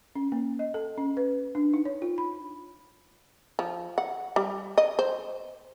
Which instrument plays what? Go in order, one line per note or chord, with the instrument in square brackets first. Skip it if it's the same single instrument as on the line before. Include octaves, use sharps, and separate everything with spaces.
[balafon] C#4
A#3
D#5
A4
C#4
B4
D4
D#4
C#5
F4
B5
[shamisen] F3
F#5
G3
D#5
C5